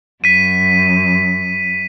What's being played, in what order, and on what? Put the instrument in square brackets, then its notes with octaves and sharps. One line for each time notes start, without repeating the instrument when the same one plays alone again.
[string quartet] F#2 [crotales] B6 D#7